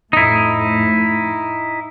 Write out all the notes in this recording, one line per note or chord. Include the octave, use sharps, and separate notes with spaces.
F2 A2 A3 D#4 E4